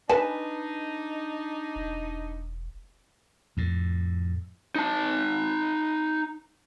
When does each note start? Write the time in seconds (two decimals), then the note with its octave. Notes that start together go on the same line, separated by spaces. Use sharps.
0.09 D4 D#4 B4 G#5 A5
1.76 E1
3.57 F2 A2
4.75 D#4 A5